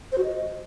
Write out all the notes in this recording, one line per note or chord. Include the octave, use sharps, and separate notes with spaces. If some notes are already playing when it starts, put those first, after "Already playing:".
C5
F#4
D#5